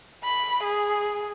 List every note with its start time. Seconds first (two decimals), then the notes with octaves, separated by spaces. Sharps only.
0.23 B5
0.63 G#4